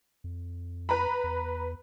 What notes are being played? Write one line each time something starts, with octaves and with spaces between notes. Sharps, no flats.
F2
B4 A#5 B5
E2